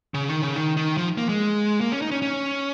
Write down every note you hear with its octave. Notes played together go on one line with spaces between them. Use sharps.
C#3
D#3
C#3
D#3
D#3
F3
A#3
G#3
A#3
C#4
D#4
C#4
C#4